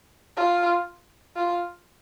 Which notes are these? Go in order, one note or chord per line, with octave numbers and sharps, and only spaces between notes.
F4
F4